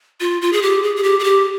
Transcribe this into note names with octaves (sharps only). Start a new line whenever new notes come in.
F4
F4
G#4
G4
G#4
G#4
G4
G#4
G4